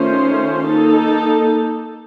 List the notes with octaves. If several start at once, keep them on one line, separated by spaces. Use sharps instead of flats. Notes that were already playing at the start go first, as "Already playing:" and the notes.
Already playing: D#3 A3 C#4 F4 C5
A#3 D#4 A4